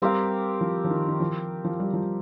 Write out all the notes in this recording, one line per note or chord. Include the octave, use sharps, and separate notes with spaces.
G3 C4 G4 A#4 F5
F3
F3
D#3
D#3
F3
F3
G3
F3